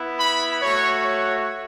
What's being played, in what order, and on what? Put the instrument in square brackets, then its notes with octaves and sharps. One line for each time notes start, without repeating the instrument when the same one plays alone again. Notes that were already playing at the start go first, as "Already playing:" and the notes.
Already playing: [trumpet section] B3 E4
B5
A3 F#4 C#5
C#5